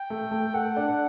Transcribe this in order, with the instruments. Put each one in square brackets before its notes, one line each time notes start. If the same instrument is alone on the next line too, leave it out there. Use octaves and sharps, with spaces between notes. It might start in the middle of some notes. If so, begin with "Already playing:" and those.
Already playing: [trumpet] G5
[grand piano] A3
A3
[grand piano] A4 [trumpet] F#5
[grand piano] D4